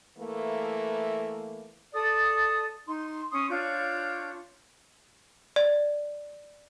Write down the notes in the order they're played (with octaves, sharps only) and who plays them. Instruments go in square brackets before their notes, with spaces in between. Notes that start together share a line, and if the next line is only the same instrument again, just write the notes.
[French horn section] E3 A3 A#3
[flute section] A4 D5 D#6
D#4 C6
C#4 C6 D#6
D4 F4 C#5 G6
[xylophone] D5